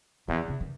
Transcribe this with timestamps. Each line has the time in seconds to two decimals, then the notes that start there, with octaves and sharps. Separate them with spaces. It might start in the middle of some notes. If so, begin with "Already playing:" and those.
0.28 E2 D#3
0.48 C#3
0.60 D#3